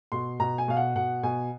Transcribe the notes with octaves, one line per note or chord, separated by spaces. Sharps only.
B2 C6
B2 A#5
G#5
B2 F5
F#5
B2 F#5
B2 G#5